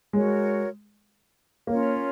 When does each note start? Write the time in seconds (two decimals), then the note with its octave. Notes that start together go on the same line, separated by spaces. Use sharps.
0.13 G#3 F#4 A#4 C#5
1.67 A#3 C#4 F4 A#4 C#5